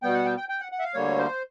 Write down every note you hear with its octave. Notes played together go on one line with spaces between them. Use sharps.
B2 G3 B3 G5
F#5
G5
G5
G5
F#5
F#5
E5
F5
D2 D3 G3 A#3 C#5
C5